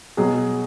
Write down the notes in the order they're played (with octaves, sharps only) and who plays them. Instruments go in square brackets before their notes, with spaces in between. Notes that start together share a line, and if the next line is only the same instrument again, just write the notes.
[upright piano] B2 F#3 [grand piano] G#4